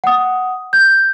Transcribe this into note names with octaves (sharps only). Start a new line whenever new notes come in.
F#5 D#6
G6